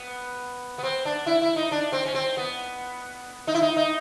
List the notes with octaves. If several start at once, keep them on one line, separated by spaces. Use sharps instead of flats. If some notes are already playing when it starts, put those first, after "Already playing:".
Already playing: B3
B3
C4
D4
E4
E4
D#4
D4
C4
C#4
C4
B3
D#4
E4
D#4
D#4